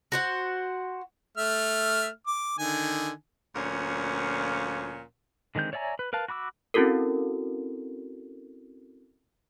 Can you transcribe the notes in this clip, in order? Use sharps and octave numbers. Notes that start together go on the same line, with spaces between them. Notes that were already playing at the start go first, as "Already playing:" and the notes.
F#4 C5 F#5
A3 E5 F6
D6
D3 D#3 G#5
D2 A#2 F3 C#4
D3 D#3 G#3 C4 G6
C#5 D5 E5 G#5 A#5
B4
A#4 B4 F5 A5
F#4 B5 D6 E6
C4 C#4 E4 F#4 A4 A#4